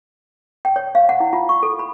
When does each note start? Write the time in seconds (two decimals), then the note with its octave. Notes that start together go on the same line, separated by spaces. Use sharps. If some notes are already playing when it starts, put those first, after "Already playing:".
0.65 G5
0.76 C#5
0.95 F5
1.09 F#5
1.20 E4
1.33 F4
1.49 C#6
1.63 A4
1.79 B5